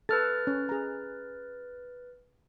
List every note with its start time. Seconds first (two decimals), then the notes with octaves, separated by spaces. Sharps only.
0.09 A4 B4 F6 A6
0.47 C#4
0.69 G#4 A#5